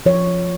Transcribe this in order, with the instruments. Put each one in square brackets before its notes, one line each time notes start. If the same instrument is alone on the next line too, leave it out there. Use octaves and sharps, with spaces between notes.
[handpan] F3 C#5